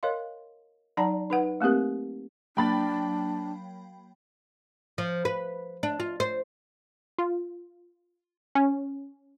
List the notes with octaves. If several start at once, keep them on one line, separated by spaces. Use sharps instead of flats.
A#4 C#5 D#5 F5 C6
F#3 D#4 D5 F#5 A5 A#5
D#4 B4 F#5
A3 A#3 C4 G4 A#4
F#3 A#3 D4 G5 B5 A6
F3
B4
D4
F4
C5
F4
C#4